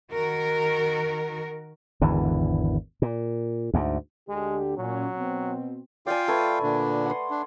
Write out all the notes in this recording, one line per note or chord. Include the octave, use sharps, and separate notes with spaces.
D#3 F#4 A#4
G#1 E2 D3 E3
A#2
D2 G#2
D2 D3 G#3 G4
A#2 F#3 C#4
B2 C4
F4 D5 F5 G5 G#5
A3 B4 G#5
A#2 D3 D4
F#5 C6
D4